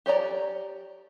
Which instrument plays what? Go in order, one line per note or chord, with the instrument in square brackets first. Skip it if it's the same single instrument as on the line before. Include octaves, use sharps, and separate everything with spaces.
[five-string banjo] G4 C#5 D5 A#5